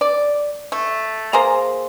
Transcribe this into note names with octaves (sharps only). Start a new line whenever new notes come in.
D5
A3
A#3 G#4 C5 A#5